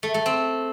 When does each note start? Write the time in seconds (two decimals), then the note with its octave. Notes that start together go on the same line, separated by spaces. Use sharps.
0.03 A3
0.14 A3
0.26 C4